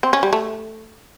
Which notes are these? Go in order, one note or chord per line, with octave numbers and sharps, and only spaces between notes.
C4
C#4
G3
A3